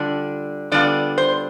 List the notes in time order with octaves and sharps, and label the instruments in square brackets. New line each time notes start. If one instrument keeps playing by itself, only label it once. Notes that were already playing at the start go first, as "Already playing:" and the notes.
Already playing: [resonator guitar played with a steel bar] D3 G3 D4 F4
D3 G3 B3 D4 F4 D5
C5